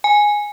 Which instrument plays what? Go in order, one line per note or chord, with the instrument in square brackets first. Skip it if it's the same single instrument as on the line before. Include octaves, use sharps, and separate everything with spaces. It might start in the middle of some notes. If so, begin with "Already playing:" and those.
[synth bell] G#5